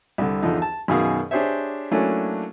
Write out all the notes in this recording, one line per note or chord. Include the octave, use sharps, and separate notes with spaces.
C2 D3
E2 D3 F3 D#4
A5
F#2 B2 D#3 G#4 F5 D#6
D4 G4 G#4 C5 C#5 E5
F#3 A3 A#3 C#4 D4 E4